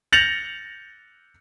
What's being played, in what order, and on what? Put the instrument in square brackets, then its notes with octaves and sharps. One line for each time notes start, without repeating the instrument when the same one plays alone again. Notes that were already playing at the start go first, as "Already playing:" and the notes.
[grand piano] G6 A6 A#6 C#7 F7 F#7